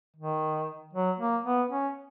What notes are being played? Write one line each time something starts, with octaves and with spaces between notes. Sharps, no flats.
D#3
F#3
A#3
B3
C#4